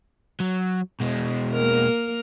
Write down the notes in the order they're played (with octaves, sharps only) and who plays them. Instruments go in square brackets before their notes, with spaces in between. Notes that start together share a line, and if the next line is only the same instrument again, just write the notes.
[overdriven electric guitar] F#3
B2 G#3
[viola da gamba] A#3 A#4